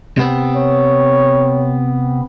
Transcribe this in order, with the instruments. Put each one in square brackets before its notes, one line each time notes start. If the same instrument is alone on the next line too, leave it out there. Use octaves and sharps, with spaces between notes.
[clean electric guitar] C3 B3 C4
[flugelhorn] C#5